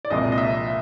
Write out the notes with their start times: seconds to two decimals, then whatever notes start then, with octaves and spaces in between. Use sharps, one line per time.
0.05 D5
0.10 C2 A#2 F3 G#3 D#5
0.32 D#5
0.38 E5